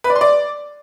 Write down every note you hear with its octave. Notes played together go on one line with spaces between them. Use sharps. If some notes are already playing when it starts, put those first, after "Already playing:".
B4
D5
C6
D5